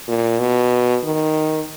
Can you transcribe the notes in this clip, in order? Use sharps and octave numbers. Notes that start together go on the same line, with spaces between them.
A#2
B2
D#3